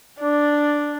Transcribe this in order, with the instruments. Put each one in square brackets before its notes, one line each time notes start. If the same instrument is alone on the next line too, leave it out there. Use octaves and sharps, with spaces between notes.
[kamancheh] D4 [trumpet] D5